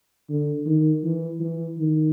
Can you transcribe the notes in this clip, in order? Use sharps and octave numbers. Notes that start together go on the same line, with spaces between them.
D3
D#3
E3
E3
D#3